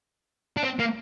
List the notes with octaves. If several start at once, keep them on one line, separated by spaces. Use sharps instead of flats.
D4
C4
A#3